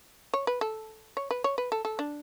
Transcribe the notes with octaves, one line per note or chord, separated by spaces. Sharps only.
C#5
B4
A4
C#5
B4
C#5
B4
A4
A4
D4